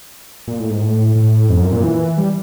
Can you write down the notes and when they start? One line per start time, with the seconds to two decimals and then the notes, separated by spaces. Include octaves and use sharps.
0.48 A#2
0.59 A2
0.70 G#2
0.82 A2
1.16 A2
1.49 F2
1.61 F#2
1.73 A#2
1.84 E3
2.18 G3